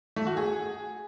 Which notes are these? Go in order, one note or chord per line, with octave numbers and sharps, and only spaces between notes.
A3
F#4
G#4